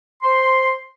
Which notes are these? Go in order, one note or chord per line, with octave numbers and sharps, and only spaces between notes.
C5 C6